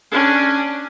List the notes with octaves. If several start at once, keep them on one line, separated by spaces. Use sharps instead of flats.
C#4 D4